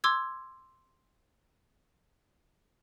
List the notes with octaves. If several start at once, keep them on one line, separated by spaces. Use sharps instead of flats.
C6 D6 E6 G#6